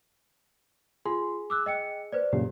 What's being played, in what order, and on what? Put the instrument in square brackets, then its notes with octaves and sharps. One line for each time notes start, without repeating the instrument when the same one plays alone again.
[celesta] F4 C6 [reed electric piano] G#4
[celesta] D6 E6 F#6
D#5 G5 C#7
B4 C5 D5
[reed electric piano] F#2 A#2 C#3 [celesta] G4